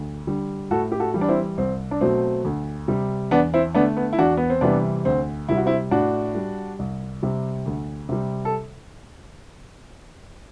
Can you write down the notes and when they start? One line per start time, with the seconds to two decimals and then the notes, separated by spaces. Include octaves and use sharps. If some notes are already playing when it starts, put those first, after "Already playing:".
Already playing: D2
0.27 D3 G3
0.71 A2 F#4 A4
0.92 G4
1.00 F#4 A4
1.14 E3 G3
1.21 D4
1.29 C4 E4
1.58 C2 C4
1.91 D4
2.01 B2 F#3 A3 C4
2.45 D2
2.88 C3 G3
3.31 E2 B3 D4
3.54 C4 E4
3.75 D3 A3 B3 D4
3.97 B3
4.13 E4
4.19 E2 D4 F#4
4.37 B3
4.50 C4
4.61 C3 E3 G3 B3 D4
5.05 D2 C4
5.49 C3 G3 E4
5.57 F#4
5.66 C4 E4
5.91 A2 D4 F#4
6.35 G3
6.79 C2
7.23 C3 G3
7.66 D2
8.09 C3 G3
8.45 A4